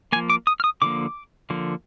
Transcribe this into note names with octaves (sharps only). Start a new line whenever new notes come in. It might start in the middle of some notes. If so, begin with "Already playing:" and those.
F3 A#3 G#5
D6
D#6
F6
D#6
D3 F3 A#3 D6
D3 F3 A#3